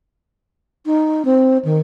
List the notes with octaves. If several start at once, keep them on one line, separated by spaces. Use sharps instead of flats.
D#4
C4
D#3